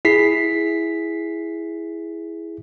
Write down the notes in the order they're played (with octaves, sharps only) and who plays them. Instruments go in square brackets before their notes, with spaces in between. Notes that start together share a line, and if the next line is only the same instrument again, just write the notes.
[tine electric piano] E4 G#4 B6 C7